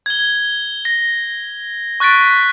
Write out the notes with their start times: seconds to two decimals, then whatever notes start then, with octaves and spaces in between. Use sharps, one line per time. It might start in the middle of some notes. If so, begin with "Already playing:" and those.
0.06 G#6 G7
0.85 A#6
2.00 C#6 F#6 A6 B6 D7